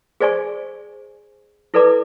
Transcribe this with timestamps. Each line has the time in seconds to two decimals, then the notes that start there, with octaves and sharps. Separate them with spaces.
0.20 G#4 C5 D5 G#5 C#6
1.74 E4 A4 B4 D5 A#5 D6